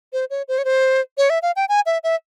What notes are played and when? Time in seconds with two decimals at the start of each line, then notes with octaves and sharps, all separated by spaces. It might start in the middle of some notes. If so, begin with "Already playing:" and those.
0.13 C5
0.30 C#5
0.48 C5
0.58 C#5
0.65 C5
1.18 C#5
1.30 E5
1.42 F5
1.56 G5
1.69 G#5
1.86 E5
2.04 E5